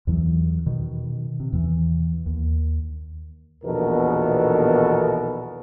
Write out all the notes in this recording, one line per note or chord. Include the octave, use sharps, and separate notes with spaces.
E2 E3 F#3
B2 D#3
C3
E2 E3
D#2
A#1 E2 B2 D#3 A4 A#4